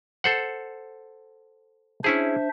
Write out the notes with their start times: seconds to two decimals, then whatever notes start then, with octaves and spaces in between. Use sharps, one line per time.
0.24 A4 C5 F#5
2.04 C#4 D4 E4 G#4 C5 E5